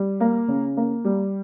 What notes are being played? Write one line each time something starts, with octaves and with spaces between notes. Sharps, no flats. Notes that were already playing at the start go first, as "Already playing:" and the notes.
Already playing: G3
A#3
C#3
A#3
G3